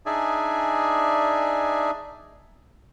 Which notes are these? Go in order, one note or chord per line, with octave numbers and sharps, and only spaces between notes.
D4 D#4 G#4 D5 E5 G#5